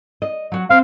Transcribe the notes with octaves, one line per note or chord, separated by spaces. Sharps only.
D#5
F#3 F#4
C4 F5